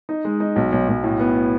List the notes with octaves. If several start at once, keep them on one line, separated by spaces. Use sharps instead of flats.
D#4
G#3
D#4
B1
B1
B1
A2
B3